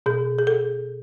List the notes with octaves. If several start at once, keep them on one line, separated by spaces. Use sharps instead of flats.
B2 G#4
G#4
A4